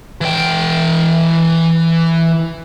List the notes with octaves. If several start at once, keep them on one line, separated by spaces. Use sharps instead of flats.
E3 G5